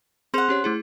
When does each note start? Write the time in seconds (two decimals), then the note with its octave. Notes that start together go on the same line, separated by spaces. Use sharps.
0.34 C4 G#4 C5 F#5 F7
0.49 C#4 G4 C#5
0.64 A3 E4 G#4